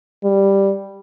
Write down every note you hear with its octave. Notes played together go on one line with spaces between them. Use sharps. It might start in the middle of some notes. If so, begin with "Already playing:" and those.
G3